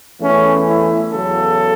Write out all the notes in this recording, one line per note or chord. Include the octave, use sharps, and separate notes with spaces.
E2 E3 A3 C#4
E4
E2 C#3 F#3 A4